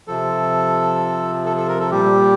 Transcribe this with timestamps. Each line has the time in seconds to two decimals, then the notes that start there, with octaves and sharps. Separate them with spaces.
0.08 C3 F3 A4
1.46 A4
1.57 A4
1.68 A#4
1.80 A4
1.91 A#2 G3 G4